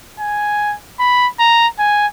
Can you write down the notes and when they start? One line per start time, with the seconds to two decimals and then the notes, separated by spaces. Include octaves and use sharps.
0.20 G#5
0.99 B5
1.39 A#5
1.79 G#5